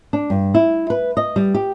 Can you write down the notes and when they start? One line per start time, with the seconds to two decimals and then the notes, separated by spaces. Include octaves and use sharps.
0.13 D4
0.30 G2
0.54 E4
0.90 B4
1.17 D#5
1.36 G3
1.54 G4